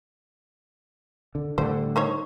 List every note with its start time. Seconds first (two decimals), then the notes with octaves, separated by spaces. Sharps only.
1.35 D3
1.58 A2 D3 G3 C5
1.96 D#4 C5 C#5